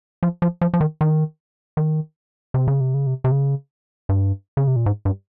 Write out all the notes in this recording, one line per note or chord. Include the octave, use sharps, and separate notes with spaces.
F3
F3
F3
F3
D#3
D#3
D#3
C3
C#3
C3
C#3
C3
C3
C#3
G2
C#3
C3
A#2
G#2
G2